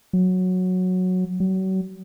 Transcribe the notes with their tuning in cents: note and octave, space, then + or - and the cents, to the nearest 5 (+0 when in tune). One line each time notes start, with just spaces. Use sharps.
F#3 -10
F#3 +35